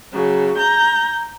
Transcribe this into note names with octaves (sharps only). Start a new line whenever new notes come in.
C#3 F#3
A#5 G6